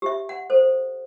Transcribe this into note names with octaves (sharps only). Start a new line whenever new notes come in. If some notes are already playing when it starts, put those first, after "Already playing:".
G4 E5
F#5
A4 C5